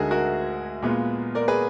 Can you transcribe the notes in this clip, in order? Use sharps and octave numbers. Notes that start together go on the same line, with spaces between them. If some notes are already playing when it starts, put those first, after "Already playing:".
Already playing: D2 D3 G#3 D#4 F#4 G#4 A#4
F#4 A#4
A#2 G#3 B3 F4
A#4 D5
G#4 B4